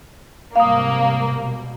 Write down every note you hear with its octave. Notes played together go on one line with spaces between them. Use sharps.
G#2 C3 G3 A#3 F5 D#6
B2